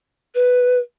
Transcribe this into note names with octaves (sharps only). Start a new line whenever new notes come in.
B4